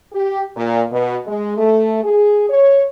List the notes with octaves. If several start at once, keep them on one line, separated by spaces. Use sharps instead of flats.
G4
A#2
B2
G#3
A3
G#4
C#5